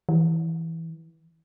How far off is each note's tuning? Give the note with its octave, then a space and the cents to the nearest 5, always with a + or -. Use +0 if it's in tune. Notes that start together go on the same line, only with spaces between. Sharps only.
E3 -10